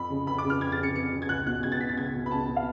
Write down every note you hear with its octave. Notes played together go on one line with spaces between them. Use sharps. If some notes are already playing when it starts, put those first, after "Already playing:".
Already playing: F2 B5
C#3
F2 B5
D6
C#3
F6
F2 G#6
A6
C#3 C#7
F2 C#7
C#3
G#6
C#2 F#6
B2 F#6
C#2 G#6
A6
B2 B6
A6
C#2 G#6
B2
B5
C#2 A5
B2
F5